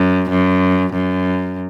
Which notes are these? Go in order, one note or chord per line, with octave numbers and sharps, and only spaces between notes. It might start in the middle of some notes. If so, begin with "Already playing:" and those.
Already playing: F#2
F#2
F#2